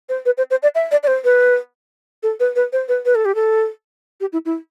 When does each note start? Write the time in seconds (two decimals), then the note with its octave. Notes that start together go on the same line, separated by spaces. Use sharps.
0.09 C5
0.26 B4
0.38 C5
0.51 C5
0.63 D5
0.75 E5
0.91 D5
1.03 D5
1.07 C5
1.24 B4
2.23 A4
2.40 B4
2.56 B4
2.73 C5
2.88 B4
3.05 B4
3.15 A4
3.25 G4
3.35 A4
4.21 G4
4.33 E4
4.45 E4